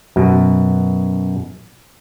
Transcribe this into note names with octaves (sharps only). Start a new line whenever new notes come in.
F#2 B2